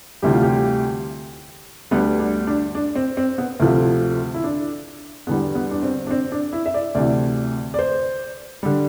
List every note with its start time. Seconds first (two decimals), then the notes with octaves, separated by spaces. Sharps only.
0.22 D2 C3 E3 G3 G4
0.33 F4
0.42 G4
1.91 D2 D3 G3 B3
2.19 D4
2.47 D4
2.75 D4
2.95 C4
3.17 C4
3.38 B3
3.60 D2 C3 F3 A3
4.34 E4
4.44 D4
5.27 E2 D3 G3 B3
5.55 B3
5.71 D4
5.83 C4
6.07 D4
6.11 C4
6.32 D4
6.53 E4
6.66 E5
6.74 D5
6.95 D2 C3 E3 D5
7.74 D5
7.79 C5
8.63 D3 G3